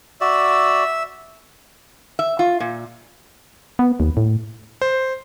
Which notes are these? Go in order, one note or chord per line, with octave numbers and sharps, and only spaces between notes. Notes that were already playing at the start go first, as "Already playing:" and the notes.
F#4 D5 E5 E6
E5
F4
A#2
B3
D#2
A2
C5